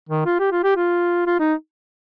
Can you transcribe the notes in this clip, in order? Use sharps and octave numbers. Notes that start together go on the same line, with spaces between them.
D#3
F4
G4
F4
G4
F4
F4
D#4